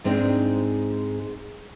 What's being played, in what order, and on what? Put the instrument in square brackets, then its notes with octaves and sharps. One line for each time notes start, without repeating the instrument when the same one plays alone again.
[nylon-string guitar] G#2 G#3 C4 D4 D#4